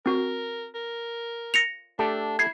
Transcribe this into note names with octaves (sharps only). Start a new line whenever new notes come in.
C4 F#4 A#4
A#4
A#6 C#7 F7
A3 D4 G4 A4
E4 G#6 C7